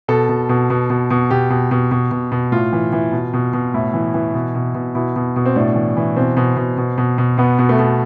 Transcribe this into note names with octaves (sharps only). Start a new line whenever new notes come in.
B2 A4
B2
B2
B2
B2
B2
B2 G4
B2
B2
B2
B2
B2
A2 F4
E3
E3
B2
B2
B2
A2 E4
E3
E3
B2
B2
B2
B2 E4
B2
B2
C4
A2 D4
E3
E3
B2 C4
B2
B2
B2
B2
B2
B2 B3
B2
A3
B2